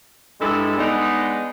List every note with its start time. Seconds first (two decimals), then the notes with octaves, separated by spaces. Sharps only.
0.41 G2 G#3 E4 A4 B5
0.78 G#3 B3 D4 D#4